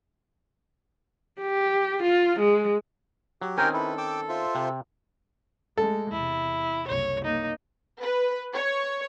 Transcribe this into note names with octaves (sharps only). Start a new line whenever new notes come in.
G4
F4
G#3
F#3 G4
D#3 C4 C#4 A#4 G5 G#5
E4 A4 B4
G5 D6 E6
F4 C5 E5
C3
G#3 A3 A4
E2 C3 E4
F#1 C2 C#5
A#3 D#4
B4
C#5